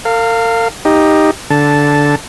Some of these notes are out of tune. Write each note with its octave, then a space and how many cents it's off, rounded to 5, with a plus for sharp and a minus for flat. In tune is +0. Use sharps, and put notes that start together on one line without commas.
A#4 -45 F5 +0
D#4 +0 G4 +10
D3 -15 A5 +0